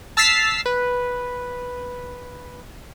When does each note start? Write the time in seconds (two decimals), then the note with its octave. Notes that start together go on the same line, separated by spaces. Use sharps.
0.17 A5 E6 F6 A6 B6 C7
0.66 B4